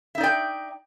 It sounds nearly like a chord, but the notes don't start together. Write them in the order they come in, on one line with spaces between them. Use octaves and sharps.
E5 D#4 D5 G5